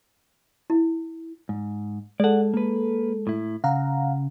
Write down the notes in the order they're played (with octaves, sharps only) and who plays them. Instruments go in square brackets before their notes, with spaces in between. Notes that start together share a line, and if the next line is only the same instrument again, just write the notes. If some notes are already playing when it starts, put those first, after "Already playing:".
[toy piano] E4
[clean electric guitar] G#2
[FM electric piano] G#3 A4 [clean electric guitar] D5 F#5
[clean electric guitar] A#3 B4
A2 E4
[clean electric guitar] C#3 [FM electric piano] F5 F#5 A#5